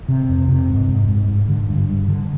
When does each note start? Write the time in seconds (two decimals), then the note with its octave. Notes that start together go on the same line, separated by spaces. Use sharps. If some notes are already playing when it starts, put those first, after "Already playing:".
0.09 C3
0.29 F2
0.49 C3
0.69 G#2
0.89 G#2
1.08 G#2
1.28 G#2
1.49 D3
1.69 G2
1.89 G2
2.08 D3